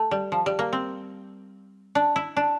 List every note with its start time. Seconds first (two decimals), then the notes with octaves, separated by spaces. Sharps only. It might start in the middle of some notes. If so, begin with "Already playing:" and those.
Already playing: A3
0.11 G3
0.32 F3
0.46 G3
0.59 A#3
0.73 C4
1.95 D4
2.16 E4
2.37 D4